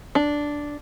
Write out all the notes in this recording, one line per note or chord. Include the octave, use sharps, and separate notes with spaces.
D4